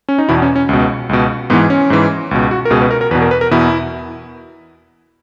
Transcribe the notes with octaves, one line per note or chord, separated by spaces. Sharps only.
C#4
D#4
E2 B2 E4
C#4
C#4
C#2 B2
C#2 B2
G#2 E3 B3
C#4
G#2 E3
C#2 B2
F#4
A#4
C#2 B2 G#4
B4
A#4
A#4
E2 B2 B4
A#4
B4
A#4
E2 B2 E4